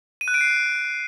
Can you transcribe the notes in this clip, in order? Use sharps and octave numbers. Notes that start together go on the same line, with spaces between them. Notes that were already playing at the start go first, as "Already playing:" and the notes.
D#7
F#6
D7
C7